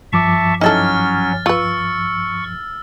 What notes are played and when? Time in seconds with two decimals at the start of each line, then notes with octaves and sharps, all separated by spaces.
0.13 G2 F3 E5 A5 C#6 D6
0.61 F#3 C#4 D#4 E4 A4 F6 A6
1.46 F4 B4 C#6 E6